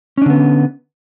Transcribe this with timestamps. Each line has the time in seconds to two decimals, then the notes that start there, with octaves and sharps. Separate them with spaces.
0.18 C#4
0.22 D4
0.26 D3
0.30 B3